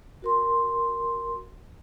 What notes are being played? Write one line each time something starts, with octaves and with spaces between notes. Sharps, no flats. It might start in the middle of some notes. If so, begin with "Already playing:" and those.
F#4 A#4 C6